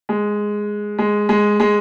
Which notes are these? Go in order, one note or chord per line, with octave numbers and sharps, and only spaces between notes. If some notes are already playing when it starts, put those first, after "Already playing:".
G#3
G#3
G#3
G#3